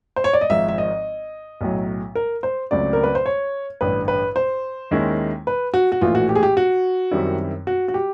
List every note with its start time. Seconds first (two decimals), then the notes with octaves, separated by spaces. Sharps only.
0.16 C5
0.24 C#5
0.33 D5
0.41 D#5
0.50 G#1 G#2 F3 E5
0.68 E5
0.78 D#5
1.61 B1 A2 F#3
2.15 A#4
2.43 C5
2.71 C#2 C#3 F#3 A3 C4 D5
2.93 A#4
3.03 B4
3.15 C5
3.26 C#5
3.81 A1 G2 D3 B4
4.08 B4
4.36 C5
4.91 D#2 D#3 G#3 C#4 E4
5.47 B4
5.74 F#4
5.92 F#4
6.01 A#1 A2 E3 A3 F4
6.15 F#4
6.29 G4
6.35 G#4
6.43 G4
6.57 F#4
7.11 F#2 D#3 G3 C4 E4
7.67 F#4
7.88 F#4
7.94 G4